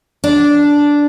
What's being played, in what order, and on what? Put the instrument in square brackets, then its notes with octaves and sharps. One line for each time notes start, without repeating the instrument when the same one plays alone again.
[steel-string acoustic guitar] D4